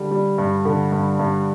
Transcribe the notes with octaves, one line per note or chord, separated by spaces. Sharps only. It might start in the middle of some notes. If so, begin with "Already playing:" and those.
Already playing: D3 G3
G3
G2
D3
G2
G2